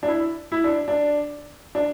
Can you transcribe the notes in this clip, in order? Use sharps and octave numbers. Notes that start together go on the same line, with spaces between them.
D4
E4
E4
D4
D4
D4